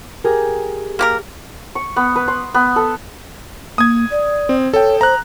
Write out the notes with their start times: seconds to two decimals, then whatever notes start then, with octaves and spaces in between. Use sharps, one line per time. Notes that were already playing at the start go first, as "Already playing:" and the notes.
0.24 G4 G#4 A#4
0.99 A#3 G4 A#4
1.75 C#6
1.96 B3
2.16 B4
2.28 C6
2.54 B3
2.76 A4
3.78 A#3 D#6 G#6
4.11 D5
4.49 C4
4.74 A4 C#5 G5
5.01 C5 A#5 F#6